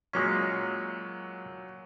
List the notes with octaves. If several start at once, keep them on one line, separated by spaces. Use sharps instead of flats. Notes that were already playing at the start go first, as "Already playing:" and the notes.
A#2 F#3 G#3 A#3 C#4 C#6